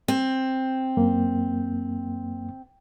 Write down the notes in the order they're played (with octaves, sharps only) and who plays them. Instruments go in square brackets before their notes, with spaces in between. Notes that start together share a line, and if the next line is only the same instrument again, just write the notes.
[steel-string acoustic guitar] C4
[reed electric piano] F#2 A#3